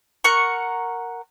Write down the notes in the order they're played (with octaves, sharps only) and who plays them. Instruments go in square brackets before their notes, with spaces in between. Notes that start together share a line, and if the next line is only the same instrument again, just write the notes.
[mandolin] A#4 F#5 C#6